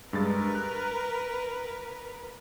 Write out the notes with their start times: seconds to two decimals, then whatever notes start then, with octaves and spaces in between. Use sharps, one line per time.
0.13 G2 G#3 A#4 B4 A6
0.55 F#6